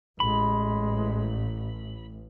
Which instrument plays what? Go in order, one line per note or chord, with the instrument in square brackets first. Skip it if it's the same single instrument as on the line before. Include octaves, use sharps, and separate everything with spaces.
[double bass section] A1 [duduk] G#3 [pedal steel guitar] B5